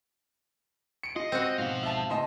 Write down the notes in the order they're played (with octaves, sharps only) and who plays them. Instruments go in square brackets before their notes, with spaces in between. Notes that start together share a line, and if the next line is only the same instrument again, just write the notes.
[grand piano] C#7 D7
[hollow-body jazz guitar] F4 [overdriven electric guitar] D#5
[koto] C4 F#4
[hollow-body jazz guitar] G#2 B2 [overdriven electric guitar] F3 F5
[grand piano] E5 A5
[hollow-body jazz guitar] C#2 A2 A5 [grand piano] D#5 C6